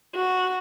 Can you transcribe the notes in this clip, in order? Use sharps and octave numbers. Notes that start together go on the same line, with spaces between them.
F#4